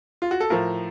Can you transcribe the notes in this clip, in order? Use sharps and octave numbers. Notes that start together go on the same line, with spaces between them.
F4
F#4
A4
A2 F3 A#4